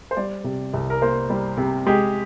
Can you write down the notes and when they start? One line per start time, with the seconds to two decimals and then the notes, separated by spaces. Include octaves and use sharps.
0.11 C5
0.17 G3 D5
0.44 C3
0.74 C2
0.90 A#4
1.02 A#3 C5
1.30 G3
1.57 C3
1.87 G#3 G4